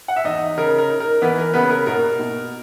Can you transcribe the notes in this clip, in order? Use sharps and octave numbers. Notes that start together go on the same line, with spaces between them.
F#5
E5
E2 D#4 D#5
C#3 A#4
A#4
D#4
A#4
E3 B3 B4
A#4
C#3 B3 B4
A#4
B2 A#4
B2